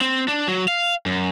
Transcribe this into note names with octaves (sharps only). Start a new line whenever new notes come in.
C4
D4
F#3
F5
F#2